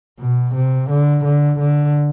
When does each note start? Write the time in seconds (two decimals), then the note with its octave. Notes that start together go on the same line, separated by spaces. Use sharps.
0.20 B2
0.55 C3
0.90 D3
1.25 D3
1.60 D3